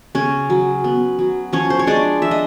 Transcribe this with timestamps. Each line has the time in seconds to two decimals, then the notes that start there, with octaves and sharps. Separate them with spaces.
0.15 C#3 C#4 C#5
0.50 F#3
0.84 B3
1.19 F#3
1.53 F3 C#4 C#5
1.70 C5
1.79 C#5
1.87 G#3 D4 D5
2.22 F3 E5
2.31 D#5